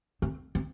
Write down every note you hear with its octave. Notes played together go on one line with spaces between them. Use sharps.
C4
C4